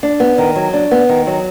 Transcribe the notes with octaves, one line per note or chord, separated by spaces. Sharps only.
D4
B3
D#3
F#3
D4
B3
D#3
F#3